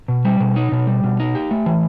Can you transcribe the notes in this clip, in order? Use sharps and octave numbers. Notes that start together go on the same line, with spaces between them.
B2
G3
B2
D#4
B2
G3
B2
D#4
G4
A3
E3